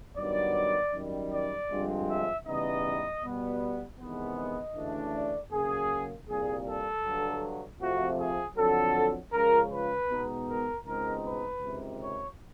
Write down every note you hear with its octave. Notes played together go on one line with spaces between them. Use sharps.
G2 D#3 F#3 B3 D5
F#2 D#3 G3
D5
G2 D3 F3 G#3 C4
E5
C#3 E3 G3 B3 D#4 D#5
B2 G3 B3
E2 C3 D#3 G#3 B3
D#5
D2 C#3 E3 A3 D4
D5
C#3 F#3 A#3 G#4
C2 A#2 G3 G#4
A4
G2 D3 F#3
F2 C3 F3 A3 F#4
G#4
F2 D3 F#3 A4
C#2 C#3 F3 A#4
B4
B2 G#3 B3 D#4
A#4
C#2 B2 G#3 C4 D#4 A#4
B4
C#2 C3 D#3
C#5